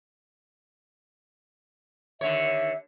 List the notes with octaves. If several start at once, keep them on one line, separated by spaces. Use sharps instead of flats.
D#2 D3 C#5 E5